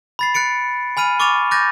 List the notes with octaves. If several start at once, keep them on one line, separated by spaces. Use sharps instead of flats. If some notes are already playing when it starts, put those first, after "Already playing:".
B5 A6 C7
F#6 A6 C#7 D7
G#5 B5 F6 D#7
C#6 D6 F6 A6 D#7 F7
D6 F#6 G6 A6 A#6 D#7